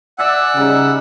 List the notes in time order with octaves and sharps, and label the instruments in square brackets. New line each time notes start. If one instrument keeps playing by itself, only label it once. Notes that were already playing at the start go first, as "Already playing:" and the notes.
[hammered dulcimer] D5 E5 G#5 [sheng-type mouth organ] F#5 [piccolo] E6
[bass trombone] C#3 [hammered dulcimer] G3 D#4